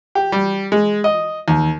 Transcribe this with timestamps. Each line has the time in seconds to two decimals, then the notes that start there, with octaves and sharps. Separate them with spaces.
0.15 G4
0.32 G3
0.72 G#3
1.04 D#5
1.48 D#2